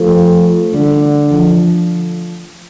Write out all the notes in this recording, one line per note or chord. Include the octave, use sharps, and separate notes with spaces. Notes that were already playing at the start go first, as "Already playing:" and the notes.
Already playing: F3 A3
D3 G3
F3